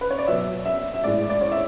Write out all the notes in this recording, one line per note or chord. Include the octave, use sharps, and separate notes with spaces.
B4
C#5
D5
B2 F#3 E5
E5
E5
A2 G#3 D5
D5
C#5
E5